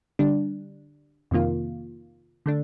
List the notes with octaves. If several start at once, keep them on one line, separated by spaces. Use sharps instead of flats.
D3 G3 D4
F2 C3 D#3 A#3 F4
D3 A3 D4